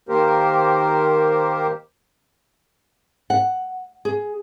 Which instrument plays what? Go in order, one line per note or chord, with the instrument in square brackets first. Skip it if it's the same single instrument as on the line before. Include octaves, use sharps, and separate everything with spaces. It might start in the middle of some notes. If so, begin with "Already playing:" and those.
[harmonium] D#3 A#3 G4 A#4 C5
[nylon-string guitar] F#5
G#4